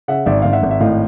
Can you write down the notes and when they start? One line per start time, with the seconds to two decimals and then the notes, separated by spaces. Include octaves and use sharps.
0.08 C#3 E5 F#5
0.26 G#1 D5 E5
0.42 G#1 F5
0.53 E5 F#5
0.63 G#1
0.71 E5
0.80 A2 D#5 F5